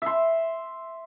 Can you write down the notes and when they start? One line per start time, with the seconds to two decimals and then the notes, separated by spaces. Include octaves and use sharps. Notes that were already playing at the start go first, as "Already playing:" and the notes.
0.02 E5 C6